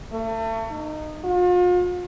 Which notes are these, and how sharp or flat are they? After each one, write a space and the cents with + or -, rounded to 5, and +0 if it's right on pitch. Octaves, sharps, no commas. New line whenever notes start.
A3 +35
D#4 -20
F4 +40